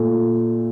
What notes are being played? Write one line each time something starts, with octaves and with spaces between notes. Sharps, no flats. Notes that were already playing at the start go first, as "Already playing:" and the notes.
Already playing: A#2 A3